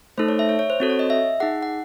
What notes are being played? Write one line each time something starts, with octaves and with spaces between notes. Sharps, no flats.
A3 D#4 A4 C5
C#5
E5
C#5
C#5
C5
C4 F#4 A4
C#5
D#5
E5
D#4 G#4 F#5
F#5